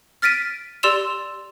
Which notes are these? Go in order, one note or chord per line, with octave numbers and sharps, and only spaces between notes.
F6 A6 B6 D7 D#7
G4 D5 C6 E6 E7 F7